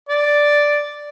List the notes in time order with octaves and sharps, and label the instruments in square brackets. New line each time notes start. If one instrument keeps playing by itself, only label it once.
[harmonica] D5